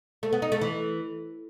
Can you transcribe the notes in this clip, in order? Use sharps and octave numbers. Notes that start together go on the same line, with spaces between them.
A3
B3
D#4
A3
E3